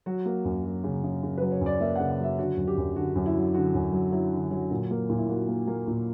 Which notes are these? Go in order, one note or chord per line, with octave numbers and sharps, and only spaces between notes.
F#3 F#4
A#3
F#2
F#3
C#3
C#3
C#3
B4
F#3
C#5
F#2
D5
A#3 E5
F#5
C#3
F#5
F#3 E5
D3 F#4
F#2
G4
F#2
D3 F#4
F#2
E4
F#3
D3 F#4
F#2
F#3
F#3 E4
D3
F#3
A#2
A#3
A#2
E4
A#3 F#4
A#3
A#3
A#2